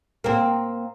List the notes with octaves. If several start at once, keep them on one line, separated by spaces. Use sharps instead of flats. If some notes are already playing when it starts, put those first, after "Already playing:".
A#3 C4